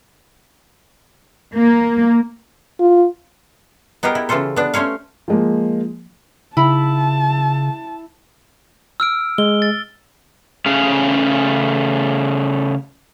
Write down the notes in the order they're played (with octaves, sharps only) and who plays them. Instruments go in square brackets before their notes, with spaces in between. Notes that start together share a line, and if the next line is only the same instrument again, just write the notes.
[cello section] A#3
[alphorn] F4
[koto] B3 D#4 G4 G#4 A#4
E4
C#3 E3 F4 A4 C5
B3 D4
A3 C#4 C5 C#5 F5
[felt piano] F3 G#3 A#3
[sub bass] C#3 [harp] E4 [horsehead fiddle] A5 [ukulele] B5
[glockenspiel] E6 F6 D7
[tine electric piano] G#3 [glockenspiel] G7
[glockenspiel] A6
[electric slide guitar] C#3 A3 C#4 G#4 F5